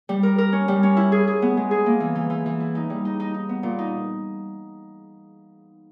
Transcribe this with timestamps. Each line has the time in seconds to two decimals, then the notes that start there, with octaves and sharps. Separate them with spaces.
0.09 G3
0.23 A#4
0.38 A#4
0.52 C#4
0.68 G3
0.83 C#4
0.97 E4
1.12 G#4
1.27 G#4
1.42 B3
1.57 G#3
1.71 G#4
1.86 A#3
2.00 E3
2.15 E3
2.30 E3
2.46 E3
2.60 E4
2.75 D#4
2.90 G3
3.05 D#4
3.20 D#4
3.34 D#4
3.49 B3
3.63 A#2
3.79 D#4